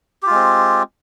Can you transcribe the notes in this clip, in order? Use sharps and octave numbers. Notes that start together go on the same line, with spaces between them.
G#3 C4 F4 G4